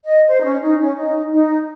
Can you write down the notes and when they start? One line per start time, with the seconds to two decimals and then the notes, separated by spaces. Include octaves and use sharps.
0.04 D#5
0.28 C5
0.40 D#4
0.45 C#4
0.63 D#4
0.80 C#4
0.97 D#4
1.32 D#4